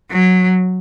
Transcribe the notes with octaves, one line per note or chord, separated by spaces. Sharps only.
F#3